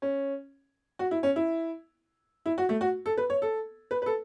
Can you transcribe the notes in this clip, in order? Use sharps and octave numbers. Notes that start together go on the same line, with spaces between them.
C#4
F#4
E4
C#4
E4
E4
F#4
A3
F#4
A4
B4
C#5
A4
B4
B4
A4